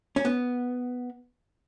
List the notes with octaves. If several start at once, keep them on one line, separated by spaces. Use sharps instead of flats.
C#4
B3